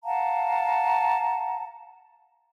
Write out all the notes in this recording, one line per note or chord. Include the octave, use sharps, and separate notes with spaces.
F5 F#5 A5 A#5